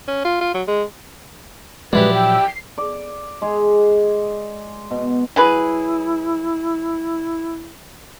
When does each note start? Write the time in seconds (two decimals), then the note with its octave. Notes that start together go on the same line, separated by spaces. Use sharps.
0.08 C#4
0.25 F4
0.41 F4
0.54 F#3
0.68 G#3
1.93 A#2 F3 F#3 G#3 D4 E4 G4 B4
2.14 G5 E6
2.48 C7
2.78 D5
3.42 G#3 G#4
4.91 B2
5.36 F#3 E4 G#4 B4